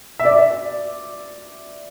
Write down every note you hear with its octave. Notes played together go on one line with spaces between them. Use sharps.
E5
D5